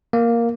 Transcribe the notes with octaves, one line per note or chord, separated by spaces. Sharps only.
A#3